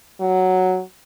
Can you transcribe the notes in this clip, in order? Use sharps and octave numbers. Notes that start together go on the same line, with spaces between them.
F#3